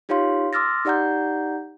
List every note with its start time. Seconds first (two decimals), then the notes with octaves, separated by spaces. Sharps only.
0.09 D#4 F4 G4 C#5 F5 C6
0.53 C6 D6 E6 F6 A6 A#6
0.85 D#4 G4 D5 F#5 A#5 G6